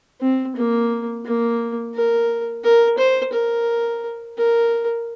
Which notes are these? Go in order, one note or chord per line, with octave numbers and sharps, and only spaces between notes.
C4
A#3
A#3
A#4
A#4
C5
A#4
A#4